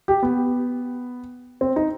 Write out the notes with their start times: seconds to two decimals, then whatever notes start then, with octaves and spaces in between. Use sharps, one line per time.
0.08 G4
0.23 B3
1.61 C4
1.76 D#4